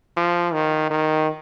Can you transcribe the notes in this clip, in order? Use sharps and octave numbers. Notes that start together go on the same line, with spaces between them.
F3
D#3
D#3